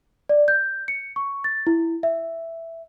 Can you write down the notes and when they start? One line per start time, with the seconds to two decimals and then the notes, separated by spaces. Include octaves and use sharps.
0.29 D5
0.48 G6
0.88 C#7
1.16 C#6
1.44 A6
1.67 E4
2.03 E5